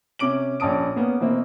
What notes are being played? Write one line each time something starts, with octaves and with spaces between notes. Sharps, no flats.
C3 C#4 D6 D7 F#7
A#1 C#4 A5 D#6 D7
A#3 B3 C#4
B2 E3 A#3 C4